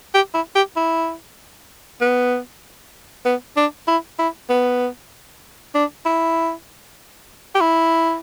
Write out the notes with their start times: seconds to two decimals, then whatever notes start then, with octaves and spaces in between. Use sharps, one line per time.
0.15 G4
0.34 E4
0.56 G4
0.76 E4
2.01 B3
3.25 B3
3.57 D4
3.88 E4
4.19 E4
4.50 B3
5.75 D4
6.05 E4
7.55 G4
7.61 E4